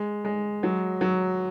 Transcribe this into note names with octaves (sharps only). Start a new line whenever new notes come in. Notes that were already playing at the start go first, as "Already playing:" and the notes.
Already playing: G#3
G#3
F#3
F#3